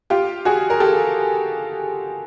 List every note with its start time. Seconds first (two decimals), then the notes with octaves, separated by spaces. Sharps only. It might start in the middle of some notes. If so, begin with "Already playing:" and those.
0.10 F4 G4
0.45 F#4 G#4
0.70 A#4
0.80 G4 A4